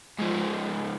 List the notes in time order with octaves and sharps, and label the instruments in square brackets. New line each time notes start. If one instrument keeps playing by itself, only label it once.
[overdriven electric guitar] G#2 F3